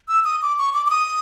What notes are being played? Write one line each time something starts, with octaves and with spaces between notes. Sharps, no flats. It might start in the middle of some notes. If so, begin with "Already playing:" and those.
E6
D#6
D6
C#6
D6
D6
D#6